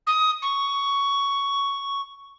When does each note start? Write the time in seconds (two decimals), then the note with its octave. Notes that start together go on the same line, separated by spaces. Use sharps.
0.06 D#6
0.42 C#6